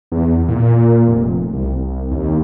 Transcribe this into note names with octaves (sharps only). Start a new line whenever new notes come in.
E2
A#2
F1
C2
D#2